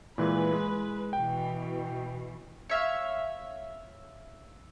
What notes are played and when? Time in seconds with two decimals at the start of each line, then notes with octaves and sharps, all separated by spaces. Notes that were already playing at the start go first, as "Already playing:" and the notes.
0.18 A#2 E3 G#3 B4
0.53 G#3
1.13 B2 E3 G5
2.69 C#5 E5 F5